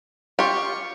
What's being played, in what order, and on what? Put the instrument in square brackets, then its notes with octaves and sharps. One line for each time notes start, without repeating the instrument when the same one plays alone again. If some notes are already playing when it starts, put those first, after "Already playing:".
[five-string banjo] F4 G4 [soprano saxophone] C#6